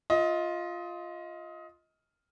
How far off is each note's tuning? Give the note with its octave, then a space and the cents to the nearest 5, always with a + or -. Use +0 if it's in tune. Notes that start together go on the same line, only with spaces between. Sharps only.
F4 +0 D#5 +25